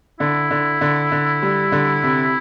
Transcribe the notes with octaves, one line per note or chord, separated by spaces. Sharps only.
D3 E4
D3
D3
D3
G3
D3
C3